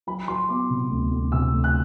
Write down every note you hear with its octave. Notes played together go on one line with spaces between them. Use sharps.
F#3 B5
F#3 C6
B3 D6
C3
D2
D2
C3 E6
D2
F#6